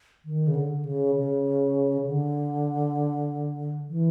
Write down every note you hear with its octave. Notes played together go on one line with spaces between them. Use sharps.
D#3
C#3
D3
C#3
C#3
D3
E3